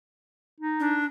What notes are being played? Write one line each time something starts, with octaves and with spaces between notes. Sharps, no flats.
D#4
D4